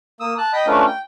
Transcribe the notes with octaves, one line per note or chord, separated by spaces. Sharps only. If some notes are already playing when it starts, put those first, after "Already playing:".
A#3 D#6 E6
A5 F#6
D#5 G5 B5 D#6
A3 C#4 D4 F4 A#4 B4
G5